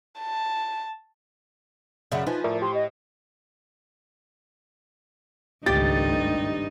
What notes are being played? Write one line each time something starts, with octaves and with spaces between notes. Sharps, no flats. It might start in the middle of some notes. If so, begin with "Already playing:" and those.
A5
F#2 C#3 D5 E5 F#5
F3 D#4 B4 G#5
A2 A#4 D5 E5
G4 C6
D#5
G#1 C#2 G2 A3 D#4 G4 A6